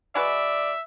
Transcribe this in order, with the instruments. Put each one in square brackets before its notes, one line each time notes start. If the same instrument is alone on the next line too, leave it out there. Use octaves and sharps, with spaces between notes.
[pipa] G#3 F#4 B4 [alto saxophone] D5 [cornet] E5